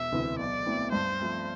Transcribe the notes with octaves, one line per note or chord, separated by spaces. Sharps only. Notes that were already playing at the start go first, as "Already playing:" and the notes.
Already playing: E1 E5
D2 C3 E3 B3
B1 D5
B2 A3 C4 E4
G2 C5
F3 A3 C4